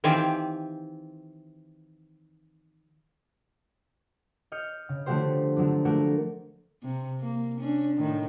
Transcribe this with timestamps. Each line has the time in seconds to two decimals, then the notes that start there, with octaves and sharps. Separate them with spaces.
0.04 D#3 E3 C4 G4 F5 G#5
4.52 D#5 F6 G6 C#7
4.89 C#3
5.06 D3 F3 A3 F#4 G4 C5
5.56 D3 F3 F#3 C4 D4
5.85 A3 A#3 F#4 A4 A#4
6.83 C3
7.20 A#3
7.61 C#4 D4
7.97 A2 D#3